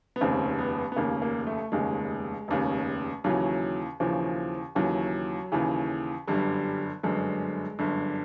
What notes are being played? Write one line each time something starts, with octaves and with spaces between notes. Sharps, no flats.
B3
F1 D#2 C#3 C4
B3
B3
F1 D#2 C#3 A#3
A#3
A3
F1 D#2 C#3 G#3
F1 D#2 C#3
D#2 C#3 E3 F#3
D#2 C#3 E3 F3
D#2 C#3 E3 F#3
D#2 C#3 E3
G1 F#2 D3 G3
G1 F#2 D3 G#3
G1 F#2 D3